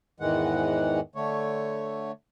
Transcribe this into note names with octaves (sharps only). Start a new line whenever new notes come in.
E2 G#2 D#3 E3 G#3 F#5
D3 A3 C#5